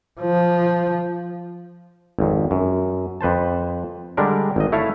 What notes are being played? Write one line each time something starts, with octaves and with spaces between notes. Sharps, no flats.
F3
G#1 F2
F#2
F2 B4 C5 A5
D3 G3 G#3 D4 A#4
G#1 D#5
A3 E4 C#5 E5 F5 A5